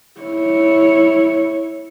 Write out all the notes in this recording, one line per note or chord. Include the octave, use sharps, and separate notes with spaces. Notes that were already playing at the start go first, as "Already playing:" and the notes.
E4 C#5